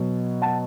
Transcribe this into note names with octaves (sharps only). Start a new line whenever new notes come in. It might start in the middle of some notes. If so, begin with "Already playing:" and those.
Already playing: B2 F#3
F#5 A5